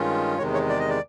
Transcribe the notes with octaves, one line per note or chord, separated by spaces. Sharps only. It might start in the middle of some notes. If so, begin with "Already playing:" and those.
Already playing: G2 D#3 G#3 C#4 F4
E2 C3 D#3 G#3 C#5
C#5
D5
D#5
D5